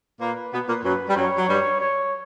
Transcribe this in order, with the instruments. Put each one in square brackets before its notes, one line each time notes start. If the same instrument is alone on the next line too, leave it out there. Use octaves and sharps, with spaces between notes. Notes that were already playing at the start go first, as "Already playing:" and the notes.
[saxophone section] A#2 A#3 [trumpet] B4
[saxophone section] B2 B3
A#2 A#3
[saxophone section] F#2 F#3 [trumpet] B4
[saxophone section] G3
[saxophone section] F#2 F#3 [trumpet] C#5
[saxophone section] F#3
G2 G3
[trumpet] C#5